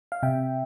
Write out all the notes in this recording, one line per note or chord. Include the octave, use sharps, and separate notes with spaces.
F5
C3 E5 G5